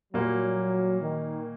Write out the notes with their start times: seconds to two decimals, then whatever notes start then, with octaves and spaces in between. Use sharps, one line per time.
0.13 A#2 F#3 G3 A#3 F#4
1.00 D#3